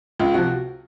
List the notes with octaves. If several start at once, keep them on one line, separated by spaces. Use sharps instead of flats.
C#2 F4
C3 F3 F#4